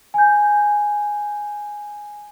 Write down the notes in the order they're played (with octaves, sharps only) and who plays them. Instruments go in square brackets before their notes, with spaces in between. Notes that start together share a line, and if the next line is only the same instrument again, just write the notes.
[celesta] G#5 G6